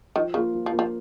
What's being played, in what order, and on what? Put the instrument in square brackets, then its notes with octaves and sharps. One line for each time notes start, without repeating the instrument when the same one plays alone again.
[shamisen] D#3 [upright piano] F3
[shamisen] C#3 [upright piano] A#3 F4
[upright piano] F3
[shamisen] F3
[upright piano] A#3 F4
[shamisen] F3